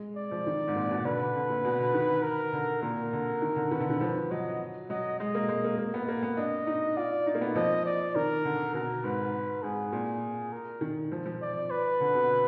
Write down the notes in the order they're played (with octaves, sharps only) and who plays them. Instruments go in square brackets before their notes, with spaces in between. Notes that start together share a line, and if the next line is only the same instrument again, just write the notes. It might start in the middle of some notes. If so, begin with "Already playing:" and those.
Already playing: [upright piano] G#3
[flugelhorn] D5
[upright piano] F3
D#3
G#2
A#2
B2
[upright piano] D3 [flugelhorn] B4
[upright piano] D3
D3
A#2
B2
D3
D#3
[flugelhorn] A#4
[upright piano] D3
[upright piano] A#2 [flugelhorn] A#4
[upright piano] D3
D#3
D3
[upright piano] D#3 [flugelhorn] B4
[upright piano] D3
D#3
F3
[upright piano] F#3 [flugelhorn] D#5
[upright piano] F#3 [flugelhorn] D#5
[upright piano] G#3 [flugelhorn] D#5
[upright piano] A#3
G#3
A#3
A#3
B3
A#3
B3
[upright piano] D4 [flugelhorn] D#5
[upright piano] D#4
[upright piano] F4 [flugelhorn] D5
[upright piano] D#4
A#3
B3
[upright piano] F3 [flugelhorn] D#5
[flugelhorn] D5
[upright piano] D#3 [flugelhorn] A#4
[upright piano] D3
[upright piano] B2 [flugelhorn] A#4
[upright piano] G#2 [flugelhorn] B4
[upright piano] G#2 [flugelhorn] G#4
[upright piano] A#2
[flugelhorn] A#4
[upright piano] D#3
F3
F3
[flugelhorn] D5
B4
[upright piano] D3
B2